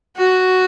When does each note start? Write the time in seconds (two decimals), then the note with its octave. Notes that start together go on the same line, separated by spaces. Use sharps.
0.18 F#4